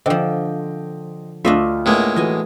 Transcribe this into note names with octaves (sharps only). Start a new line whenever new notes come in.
D3 F3 C5 D#5 G5
D2 A3 D4 F4 D#5 E5
A2 G#3 A#3 B3
E3 F#4 A4 D#5 G#5